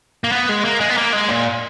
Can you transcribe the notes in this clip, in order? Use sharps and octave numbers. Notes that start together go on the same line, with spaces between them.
A#3
B3
G#3
A#3
G#3
B3
A#3
G#3
A#2